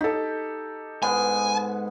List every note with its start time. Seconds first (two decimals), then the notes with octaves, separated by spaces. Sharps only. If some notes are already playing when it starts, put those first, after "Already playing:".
0.01 D#4 G4 A4
1.03 G#2 B3 G#5